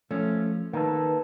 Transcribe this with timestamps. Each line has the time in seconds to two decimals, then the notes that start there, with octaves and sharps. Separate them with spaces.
0.11 F3 A3 C#4
0.73 D#3 A#3 D#4 A4 B4